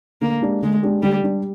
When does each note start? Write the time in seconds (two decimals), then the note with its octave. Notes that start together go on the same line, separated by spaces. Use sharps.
0.21 D3 A#3
0.42 G#3 D4 G4
0.62 D3 G#3
0.83 G#3 D4 G4
1.02 D3 G3
1.23 G3 D4